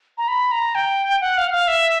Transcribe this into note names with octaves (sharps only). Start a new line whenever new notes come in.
A#5
B5
A#5
G5
F#5
F5
F#5
F5
E5